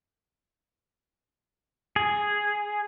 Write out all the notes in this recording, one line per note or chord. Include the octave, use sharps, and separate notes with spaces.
G#4